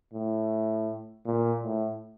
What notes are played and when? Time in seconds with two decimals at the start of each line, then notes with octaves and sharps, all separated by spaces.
0.14 A2
1.26 A#2
1.63 A2